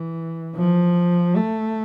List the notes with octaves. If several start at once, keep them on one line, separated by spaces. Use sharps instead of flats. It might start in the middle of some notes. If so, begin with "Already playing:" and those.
Already playing: E3
F3
A3